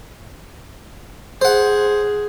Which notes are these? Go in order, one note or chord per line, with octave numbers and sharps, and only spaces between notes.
G#4 C5 F#5